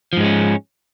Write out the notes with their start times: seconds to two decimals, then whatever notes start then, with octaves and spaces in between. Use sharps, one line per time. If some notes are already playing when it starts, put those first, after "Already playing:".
0.13 F3
0.17 G#2
0.20 G#3
0.24 C#4